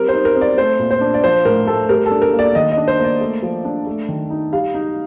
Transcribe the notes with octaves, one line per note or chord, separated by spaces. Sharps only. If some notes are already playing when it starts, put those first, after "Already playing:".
Already playing: G3 C4 A#4
C5
D#4
A#4
C4
D5
A3 C5
A#2
C5
D4
D5
F3 C5
A2 A#4
A3 A4
G3 A#4
A4
D4
A#4
A#3
D5
D#3 D#5
D#5
D4
C5
A#3 D5
A3
F3
D4
A3
D#3
D#4
G3 F5
D#4